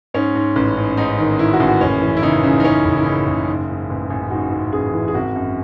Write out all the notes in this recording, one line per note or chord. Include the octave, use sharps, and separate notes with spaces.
G#2 C#4
G#2
A1
G#2
G#2 D#4
D#3
D#3 E4
F#4
A1
F#4
F#1 C#4
E3
E4
C#3 D#4
C#3
D#4
C#3 C#4
F#1
E4
C#3 D#4
F#1
G#2
G#2
A1
A1
G#2 F#4
G#2
A1 G#4
E3
G#4
G#1 F#4
F#2